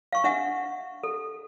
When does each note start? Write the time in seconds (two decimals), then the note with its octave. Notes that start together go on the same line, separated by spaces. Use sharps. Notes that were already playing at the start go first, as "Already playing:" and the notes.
0.12 F5 C#6
0.24 D4 E5 F#5
1.03 A4